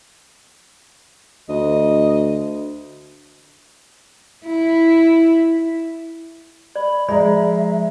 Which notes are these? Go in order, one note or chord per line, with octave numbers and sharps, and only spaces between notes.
D2 D#5
E4
D5 B5
F3 G#3 D5 E5 A#5 B5